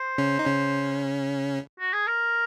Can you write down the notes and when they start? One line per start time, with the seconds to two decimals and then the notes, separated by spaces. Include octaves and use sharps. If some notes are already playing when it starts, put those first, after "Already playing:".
Already playing: C5
0.18 C#3 C#4
0.39 D#4
0.46 C#3 C#4
1.80 F#4
1.93 G#4
2.07 A#4